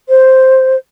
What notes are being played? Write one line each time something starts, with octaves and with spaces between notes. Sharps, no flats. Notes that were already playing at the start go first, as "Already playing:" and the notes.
C5